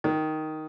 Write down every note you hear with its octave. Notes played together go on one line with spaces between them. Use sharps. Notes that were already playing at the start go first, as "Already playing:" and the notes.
D#3